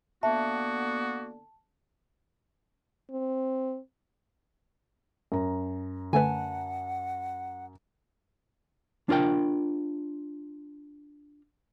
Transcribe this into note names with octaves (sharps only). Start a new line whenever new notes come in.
D3 A#3 B3 F#4 E5 A5
C4
F#2 A#5
D3 A3 B4 F#5 G#5 A5
D4 F4 A#4 G5